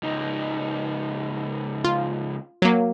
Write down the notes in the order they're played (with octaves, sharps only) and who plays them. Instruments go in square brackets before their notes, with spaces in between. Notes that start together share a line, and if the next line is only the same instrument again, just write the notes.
[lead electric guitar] C#2 D#4
[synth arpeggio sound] F4
F#3 A#3